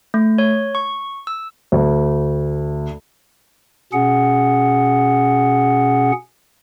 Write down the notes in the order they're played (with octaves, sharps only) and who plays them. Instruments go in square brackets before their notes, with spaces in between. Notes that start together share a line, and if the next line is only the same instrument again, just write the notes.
[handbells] A3
C#5
C#6
E6
[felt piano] D2
[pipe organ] B2 C#4 G#4 F#5